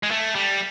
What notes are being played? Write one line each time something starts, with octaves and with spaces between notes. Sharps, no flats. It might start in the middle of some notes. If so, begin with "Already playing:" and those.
G#3
A3
G3